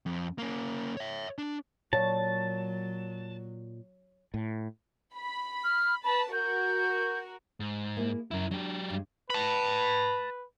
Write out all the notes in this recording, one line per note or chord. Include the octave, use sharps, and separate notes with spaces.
F2
A#3 C#4
C#5 E5
D4
A#2 F#3 C#5 A5
A2
B5
F6
B4 A5 B5
F#4 A#4 G6
G#2
A#3 E4 G#4
F#2 E4 A#4
F#3 D4 G4
G2 G#3
B4 A5 B5